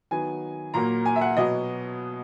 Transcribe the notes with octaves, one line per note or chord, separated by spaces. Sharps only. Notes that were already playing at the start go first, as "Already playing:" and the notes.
D#3 F#3 B3 G#5
A#2 F#3 A#3 A#5
G#5
E5
F#5
B2 F#3 B3 D#5